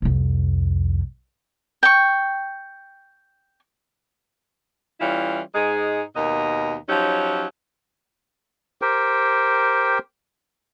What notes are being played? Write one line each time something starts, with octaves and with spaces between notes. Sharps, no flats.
C2 F2
G5 C#6
E3 G3 C#4 E4 F4
G#2 G#3 D#4 G#4
D#2 B2 A#4 D#5
F3 F#3 C#4 D#4 G4
G4 A#4 C5 G5